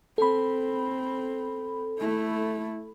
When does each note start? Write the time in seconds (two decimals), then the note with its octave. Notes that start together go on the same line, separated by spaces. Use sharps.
0.18 C4 A4 B5
1.99 A3 E4